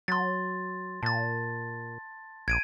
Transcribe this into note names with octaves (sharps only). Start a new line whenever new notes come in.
F#3 C6 A6
A#2 A5 A6
A#1 G#6 D7 D#7